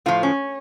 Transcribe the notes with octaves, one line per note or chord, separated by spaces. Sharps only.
A2 F3 F4
C#4